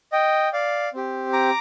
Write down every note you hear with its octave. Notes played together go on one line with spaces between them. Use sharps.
D#5 G5
D5 F5
C4 G4
A#5 D6